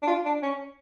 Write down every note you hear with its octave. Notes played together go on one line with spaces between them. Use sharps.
D4
F4
D4
C#4